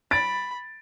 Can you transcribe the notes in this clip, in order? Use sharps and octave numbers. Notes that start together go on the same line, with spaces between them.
B5 A6 D7